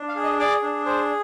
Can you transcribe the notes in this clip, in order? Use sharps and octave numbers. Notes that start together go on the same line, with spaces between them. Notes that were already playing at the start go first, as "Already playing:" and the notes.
Already playing: D4
F5
G#4
D#5
G#4 D5
D4
G#4 C5